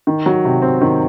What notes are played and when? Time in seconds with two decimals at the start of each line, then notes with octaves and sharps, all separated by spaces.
0.07 D#3
0.26 F#3
0.45 C3
0.62 C4
0.81 D#3